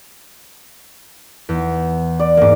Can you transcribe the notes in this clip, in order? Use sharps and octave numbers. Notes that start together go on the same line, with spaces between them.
E2
D5
G#2 A#3 F5 D6